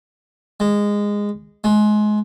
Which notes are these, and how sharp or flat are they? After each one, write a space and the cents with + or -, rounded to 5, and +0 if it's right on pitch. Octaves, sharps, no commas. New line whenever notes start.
G#3 -15
G#3 +25